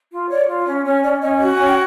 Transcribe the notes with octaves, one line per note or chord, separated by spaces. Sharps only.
F4
C#5 D5
F4
C#4 C#5
C#4 C#5
C#4 D5
C#4 D#5
F#4
G#5
C#4
G5